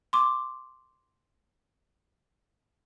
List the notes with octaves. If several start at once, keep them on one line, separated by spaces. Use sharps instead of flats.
C6 D6